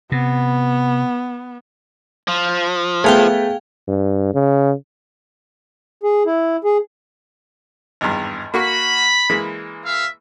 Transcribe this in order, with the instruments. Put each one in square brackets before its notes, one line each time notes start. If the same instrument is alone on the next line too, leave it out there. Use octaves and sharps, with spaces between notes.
[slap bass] C3 [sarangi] B3
[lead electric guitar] F3
[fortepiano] A3 B3 [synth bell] G#4 F5 G5
[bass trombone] G2
C#3
[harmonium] G#4
E4
G#4
[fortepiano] G#1 E2 G2
[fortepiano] A#3 F#4 C#6 [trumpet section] B5
[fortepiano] E3 G#3 A#3
[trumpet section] E5 F5